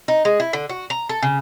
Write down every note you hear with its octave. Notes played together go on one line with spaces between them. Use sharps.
D#4
G#3
E4
D3
F#4
A#5
A4
C#3